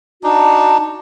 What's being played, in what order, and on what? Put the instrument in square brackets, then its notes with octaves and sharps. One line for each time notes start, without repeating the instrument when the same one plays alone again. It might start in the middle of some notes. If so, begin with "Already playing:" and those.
[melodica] D4 D#4 [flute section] F#4 A5